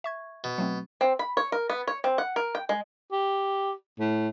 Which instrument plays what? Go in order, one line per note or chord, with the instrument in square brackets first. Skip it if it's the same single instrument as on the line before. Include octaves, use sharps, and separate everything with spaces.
[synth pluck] E5 C#6 G#6
[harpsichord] B2
[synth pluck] F#3 A3 C4
[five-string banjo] C4
B5
C#5
A#4
B3
C#5
C4
F#5
A#4
G5
G#3
[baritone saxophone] G4
A2